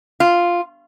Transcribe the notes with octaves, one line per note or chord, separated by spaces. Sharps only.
F4